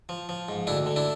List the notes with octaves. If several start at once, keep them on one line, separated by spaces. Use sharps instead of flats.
F3
F3
G#2
D2 D4 E4
D3
D4 E4